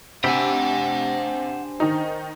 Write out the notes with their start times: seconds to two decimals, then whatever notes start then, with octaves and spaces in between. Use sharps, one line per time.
0.24 C3 D4 G4 C5 F#5 G#5 B5 E6
1.80 D#3 D#4